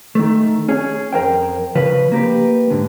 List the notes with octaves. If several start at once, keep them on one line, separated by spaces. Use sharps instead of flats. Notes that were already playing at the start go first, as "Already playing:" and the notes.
D#3 A3
C#4 G#4
F2 A#4 C5 G5
C#3 F3 B4
A#3 G4 B4
G#2 D3